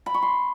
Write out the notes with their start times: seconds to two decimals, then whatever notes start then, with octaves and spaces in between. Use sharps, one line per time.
0.06 B5
0.14 C#6
0.22 C6